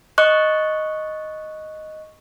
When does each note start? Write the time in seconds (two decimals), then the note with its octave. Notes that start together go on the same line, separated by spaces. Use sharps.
0.18 D#5 C#6 F#6